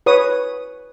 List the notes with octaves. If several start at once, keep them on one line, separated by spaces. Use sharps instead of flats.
B4 C#5 D#6